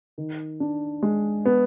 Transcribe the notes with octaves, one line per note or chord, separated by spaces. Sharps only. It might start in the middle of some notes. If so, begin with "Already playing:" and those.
D#3
D4
G#3
B3